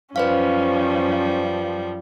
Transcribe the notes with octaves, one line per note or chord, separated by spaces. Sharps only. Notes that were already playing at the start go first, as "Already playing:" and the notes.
F#2 F3 G3 C#4 B4 C5 F5